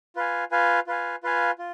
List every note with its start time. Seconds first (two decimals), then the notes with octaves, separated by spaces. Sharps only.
0.16 F4 B4 F5 G#5
0.51 F4 B4 F5 G#5
0.87 F4 B4 F5 G#5
1.23 F4 B4 F5 G#5
1.58 F4